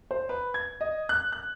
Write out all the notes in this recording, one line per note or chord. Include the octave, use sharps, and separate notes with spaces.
C5
B4
G#6
D#5
F#6
F#6